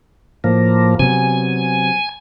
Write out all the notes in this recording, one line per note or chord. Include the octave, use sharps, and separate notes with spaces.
A2 F3 A#3
C3 F#3 B3 G#5